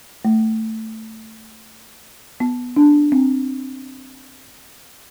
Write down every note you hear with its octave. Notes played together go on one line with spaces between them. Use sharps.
A3
B3
D4
C4